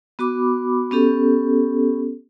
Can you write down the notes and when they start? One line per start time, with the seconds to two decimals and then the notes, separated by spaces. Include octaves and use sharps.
0.19 B3 F#4 B5 D6
0.91 B3 C#4 G4 A4